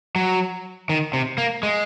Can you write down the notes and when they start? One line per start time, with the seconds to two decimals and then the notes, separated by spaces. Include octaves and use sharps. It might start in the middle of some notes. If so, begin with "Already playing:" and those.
0.16 F#3
0.89 D#3
1.13 C3
1.38 A#3
1.63 G#3